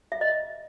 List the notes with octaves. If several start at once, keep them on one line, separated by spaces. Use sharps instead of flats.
E5
D#5